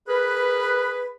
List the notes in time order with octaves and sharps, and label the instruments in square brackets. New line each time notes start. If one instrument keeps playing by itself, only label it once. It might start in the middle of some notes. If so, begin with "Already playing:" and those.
[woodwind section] G#4 A#4 B4